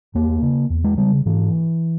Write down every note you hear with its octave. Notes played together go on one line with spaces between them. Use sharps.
E2 A#3
C#3
E2
G#3
C#3 G3
G#2 E3